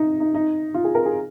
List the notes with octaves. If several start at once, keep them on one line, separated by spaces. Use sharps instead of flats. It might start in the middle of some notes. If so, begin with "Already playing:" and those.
Already playing: D#4
D#4
D#4
F4
G#4
A#4
G#4